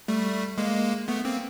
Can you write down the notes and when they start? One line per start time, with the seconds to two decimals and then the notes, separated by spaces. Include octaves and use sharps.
0.08 G3 A3
0.58 G#3 A#3
1.08 A3 B3
1.25 A#3 C4